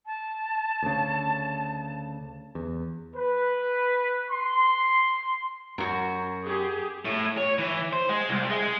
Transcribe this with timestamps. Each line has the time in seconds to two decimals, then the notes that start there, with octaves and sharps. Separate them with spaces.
0.06 A5
0.83 D2 C#3
2.55 E2
3.16 B4
4.31 C6
5.78 F#2 F#4 A#5
6.44 G4 G#4
7.05 A2
7.38 C#5
7.58 E3
7.93 C5
8.09 G#3
8.29 C2
8.50 G#3